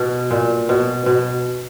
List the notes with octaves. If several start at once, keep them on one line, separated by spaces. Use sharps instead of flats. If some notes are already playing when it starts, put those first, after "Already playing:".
Already playing: B2
A#2
B2
B2